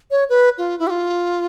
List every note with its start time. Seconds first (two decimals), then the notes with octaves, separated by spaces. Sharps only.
0.11 C#5
0.29 B4
0.58 F4
0.79 E4
0.87 G4
0.90 F4